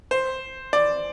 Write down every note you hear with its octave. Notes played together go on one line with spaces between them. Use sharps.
C5
D5